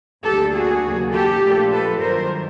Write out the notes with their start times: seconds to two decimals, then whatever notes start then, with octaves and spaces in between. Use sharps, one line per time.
0.24 D2 D3 G3 A#3 D4 G4 A4
0.54 F#4 G#4
0.83 D#2 C#3 F#3 A#3
1.12 G4 A4
1.42 A#2 F3 A3 D4 F4
1.71 A4 B4
2.00 G2 D#3 F#3 A#4 C5